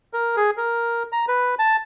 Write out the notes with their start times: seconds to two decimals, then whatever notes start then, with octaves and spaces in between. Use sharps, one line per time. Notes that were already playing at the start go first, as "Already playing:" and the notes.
0.13 A#4
0.37 G#4
0.57 A#4
1.12 A#5
1.28 B4
1.59 A5